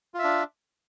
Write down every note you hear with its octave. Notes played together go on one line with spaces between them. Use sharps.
D4 F4 E5